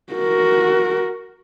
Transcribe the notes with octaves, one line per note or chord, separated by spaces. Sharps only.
F#4 A#4